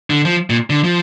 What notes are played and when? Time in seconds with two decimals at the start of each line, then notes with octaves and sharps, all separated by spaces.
0.10 D3
0.25 F3
0.50 A#2
0.70 D3
0.84 F3